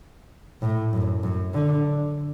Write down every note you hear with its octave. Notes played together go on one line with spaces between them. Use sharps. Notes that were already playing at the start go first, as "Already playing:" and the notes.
A2
F#2
F#2
D3